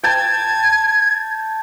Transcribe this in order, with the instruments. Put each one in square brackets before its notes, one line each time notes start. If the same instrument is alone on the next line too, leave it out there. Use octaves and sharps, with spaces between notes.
[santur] G5 A5 [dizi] G#6